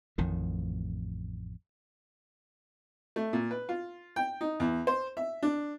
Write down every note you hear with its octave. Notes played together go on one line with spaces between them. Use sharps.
A1 F2 A2 D#3
A3
A#2
B4
F4
G5
D#4
E2
C5
E5
D4